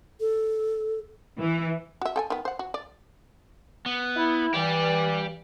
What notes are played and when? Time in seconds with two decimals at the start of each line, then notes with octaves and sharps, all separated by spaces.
0.20 A4
1.38 E3
2.01 F#4 E5
2.16 A4 G5 G#5
2.30 D#3 B3
2.45 C5 F#5
2.59 F#4
2.74 D5
3.86 B3
4.17 E4
4.54 G2 E3 G4 D5